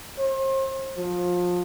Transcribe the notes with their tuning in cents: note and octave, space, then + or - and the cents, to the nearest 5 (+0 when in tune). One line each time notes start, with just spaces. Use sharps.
C5 +40
F3 +25